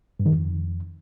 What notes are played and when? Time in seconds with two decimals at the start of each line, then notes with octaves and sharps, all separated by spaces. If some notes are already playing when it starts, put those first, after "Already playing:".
0.20 G2
0.26 D#3
0.32 F2